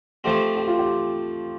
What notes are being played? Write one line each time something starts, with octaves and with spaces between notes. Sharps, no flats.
F3 A3 C4 G4
G4
F4
G4